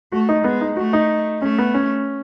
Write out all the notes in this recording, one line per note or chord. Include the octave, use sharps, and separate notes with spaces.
A3 F#4
D#4
G#3 B3
D#4
A3 F#4
D#4
A3 C#4
B3
C#4